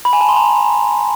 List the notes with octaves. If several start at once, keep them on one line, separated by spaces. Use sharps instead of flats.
B5
G#5
A5
C6
A#5